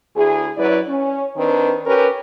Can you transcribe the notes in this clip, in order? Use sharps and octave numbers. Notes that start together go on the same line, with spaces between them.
D2 E4 G#4
F#2 F#3 E4 B4 D5
C#4
D#3 C4 D4 B4
C#4 G4 A#4 B4